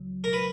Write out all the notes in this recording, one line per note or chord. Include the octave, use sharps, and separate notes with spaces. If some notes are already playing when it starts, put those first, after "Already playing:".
Already playing: C#2 C#3 F#3
A#4
B4